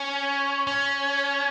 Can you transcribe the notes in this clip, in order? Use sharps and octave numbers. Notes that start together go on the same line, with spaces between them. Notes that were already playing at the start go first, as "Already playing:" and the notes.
Already playing: C#4
C#4